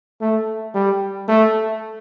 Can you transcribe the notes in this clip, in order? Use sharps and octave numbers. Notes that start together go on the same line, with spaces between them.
A3
G3
A3